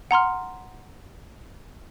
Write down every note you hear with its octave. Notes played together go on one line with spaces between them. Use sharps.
F#5 A#5 C6 F6